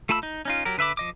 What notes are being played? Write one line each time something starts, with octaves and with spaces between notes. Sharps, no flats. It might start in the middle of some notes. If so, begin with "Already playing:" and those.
A3 F4 A5 B5 E6
D#4
C#4 D#4 F4
F#3 G4 A#4
D3 B4 E5 B5 D6
F3 D#5 D6